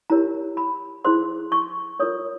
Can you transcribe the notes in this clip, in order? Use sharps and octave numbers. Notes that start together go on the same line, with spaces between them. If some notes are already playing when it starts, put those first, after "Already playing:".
E4 G4 A#4 C#5 A#5
B5
E4 G#4 C5 C6
C#6
F4 A#4 C#5 D#6